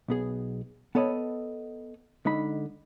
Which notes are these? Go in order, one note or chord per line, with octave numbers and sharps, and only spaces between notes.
B1 B3 G#4
B3 A4 C#5 D#5 B5
D3 G#3 D#4 B5